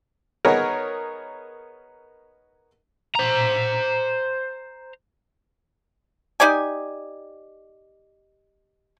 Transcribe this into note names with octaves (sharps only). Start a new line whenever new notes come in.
B3 D#4 G#4 A#4 C#5
C5 A#5
D#4 G4 D5 G#5